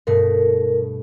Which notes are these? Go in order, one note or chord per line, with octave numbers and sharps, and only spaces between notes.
G2 B2 A3 A#4